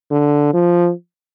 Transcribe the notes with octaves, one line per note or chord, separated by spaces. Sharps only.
D3
F3